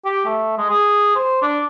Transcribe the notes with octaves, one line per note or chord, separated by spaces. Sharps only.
G4
A3
G#3
G#4
C5
D4